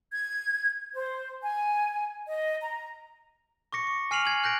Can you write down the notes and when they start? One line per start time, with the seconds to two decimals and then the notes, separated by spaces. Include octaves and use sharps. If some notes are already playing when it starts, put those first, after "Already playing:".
0.12 G#6
0.95 C5
1.43 G#5
2.27 D#5
2.61 A#5
3.73 C#6 D6 A#6 C#7
3.87 C#7
4.11 G#5 F6 C7 D#7 F7 F#7
4.25 G#6 F#7
4.44 F#6 G6 A#6 D7